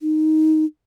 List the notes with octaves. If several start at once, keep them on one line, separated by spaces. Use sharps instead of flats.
D#4